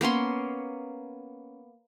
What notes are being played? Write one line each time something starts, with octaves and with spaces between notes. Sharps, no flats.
A#3 B3 C#4 C6